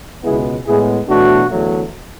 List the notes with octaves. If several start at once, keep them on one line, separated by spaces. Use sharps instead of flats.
C#2 B2 G#3 B3 E4 G#4
A2 G#3 B3 E4 G#4
E2 B2 F#3 A3 D4 F#4
E2 D3 F#3 A3